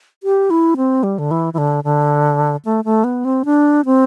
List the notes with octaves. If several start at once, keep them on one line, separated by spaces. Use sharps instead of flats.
G4
E4
C4
G3
D3
E3
E3
D3
D3
A3
A3
B3
C4
D4
C4